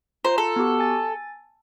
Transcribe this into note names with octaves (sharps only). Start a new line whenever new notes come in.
F4 C5 A#5
A4
B3 F#4 G4
G#5 A6